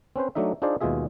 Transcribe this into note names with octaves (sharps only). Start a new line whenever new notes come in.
C4 C#4 B4 C5
F#3 A3 D4 D#4 E5
D4 D#4 F4 G#4 C5 D5
D#2 B2 G#3 F4 G#4 E5